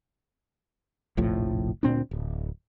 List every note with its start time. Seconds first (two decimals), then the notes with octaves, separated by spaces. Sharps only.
1.17 F1 A#1 A2 F3
1.83 D2 A#2 C4 D4
2.11 D1